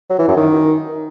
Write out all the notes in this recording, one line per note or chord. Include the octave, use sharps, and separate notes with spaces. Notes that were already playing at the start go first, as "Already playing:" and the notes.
F#3
E3
F#2
D#3